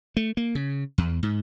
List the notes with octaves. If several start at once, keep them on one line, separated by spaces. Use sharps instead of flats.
A3
A#3
C#3
E2
G#2